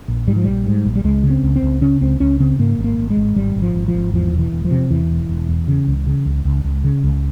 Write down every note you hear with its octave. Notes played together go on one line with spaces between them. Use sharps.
A#1
G#2 G3
F3
A#1 G3
G#2
A#1
G3
C#2 G#3
C#3
C4
C#2
C4
C#2
C#3 C#4
C#2 C4
C#2 C#4
C#3 C4
G#2 A#3
G#1
A#3
G#1
G#3
G#1
G#1 G3
G#1
F3
G#1
F3
G#1
E2 F3
E1
E3
E1
F3
C3
E2 E3
E1
E1
E2
C#3
C#2
C#3
C#2
C#2
C#2
C#3
C#2